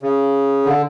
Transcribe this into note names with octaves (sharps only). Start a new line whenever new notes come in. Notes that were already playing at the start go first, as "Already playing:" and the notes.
C#3
D3